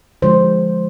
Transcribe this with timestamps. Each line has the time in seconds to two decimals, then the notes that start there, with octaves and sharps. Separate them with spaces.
0.22 D3 F3 G#3 C5